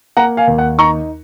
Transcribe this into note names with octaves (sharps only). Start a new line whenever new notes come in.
A#3 F#5 A#5
F5 G#5
D#2
F#5
D#4 A#5 C#6